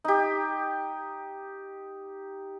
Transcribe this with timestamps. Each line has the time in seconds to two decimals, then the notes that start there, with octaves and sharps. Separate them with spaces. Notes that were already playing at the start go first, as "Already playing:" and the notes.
0.04 D#4 G4